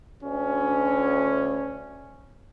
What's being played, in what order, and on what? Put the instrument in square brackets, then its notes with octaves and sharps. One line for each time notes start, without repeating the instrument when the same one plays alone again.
[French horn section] D2 [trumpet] C#4